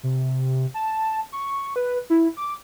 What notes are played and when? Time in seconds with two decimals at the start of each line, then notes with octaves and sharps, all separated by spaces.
0.03 C3
0.74 A5
1.32 C#6
1.76 B4
2.10 E4
2.37 D6